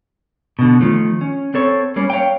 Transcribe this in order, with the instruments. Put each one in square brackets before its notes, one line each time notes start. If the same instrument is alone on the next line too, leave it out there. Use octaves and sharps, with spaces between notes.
[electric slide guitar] B2 D3
D#3 F3 A3
C#4
C4 A4 C#5
G3 A#3 C#4
C#5 F5 G5